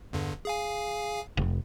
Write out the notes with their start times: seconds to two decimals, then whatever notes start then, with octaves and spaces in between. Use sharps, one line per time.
0.13 E2 G2 D3
0.45 G#4 F5 G#5
1.37 F1